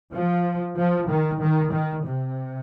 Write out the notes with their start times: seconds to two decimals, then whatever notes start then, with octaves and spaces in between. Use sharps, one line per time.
0.14 F3
0.77 F3
1.08 D#3
1.41 D#3
1.72 D#3
2.04 C3